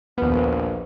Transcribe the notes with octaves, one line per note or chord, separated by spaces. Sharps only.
A#1 D#2 B3 B4